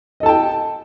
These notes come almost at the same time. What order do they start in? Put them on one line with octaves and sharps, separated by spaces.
D#5 A4 A5 G5